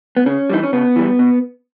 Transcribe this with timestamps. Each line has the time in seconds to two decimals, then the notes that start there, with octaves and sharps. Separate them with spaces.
0.17 B3
0.26 C#3 C#4
0.50 E3 G3 D#4
0.63 C#4
0.73 C#3 B3
0.96 E3 G3
1.19 B2